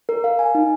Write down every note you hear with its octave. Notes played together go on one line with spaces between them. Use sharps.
A#4
F5
G#5
D#4